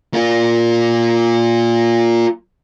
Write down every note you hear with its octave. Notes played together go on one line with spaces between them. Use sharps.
A#3 F4